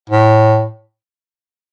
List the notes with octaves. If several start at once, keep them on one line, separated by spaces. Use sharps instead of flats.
A2